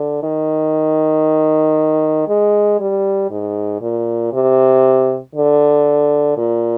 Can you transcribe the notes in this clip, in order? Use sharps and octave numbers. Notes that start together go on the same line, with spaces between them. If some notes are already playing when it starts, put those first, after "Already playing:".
Already playing: D3
D#3
G#3
G3
G#2
A#2
C3
D3
A#2